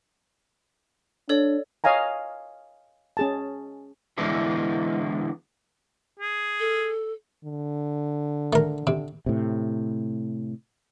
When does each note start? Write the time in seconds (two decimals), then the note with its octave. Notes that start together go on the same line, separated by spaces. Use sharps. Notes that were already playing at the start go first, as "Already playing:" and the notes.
1.29 D4 A4 C#5 D5
1.84 C#5 D#5 F5 G#5 A#5
3.17 C#4 G#4 A5
4.18 D3 E3 G#3 B3 D4 E4
6.19 G#4
6.60 A4
7.44 D3
8.53 A3 A#4
8.87 C3
9.26 A2 C3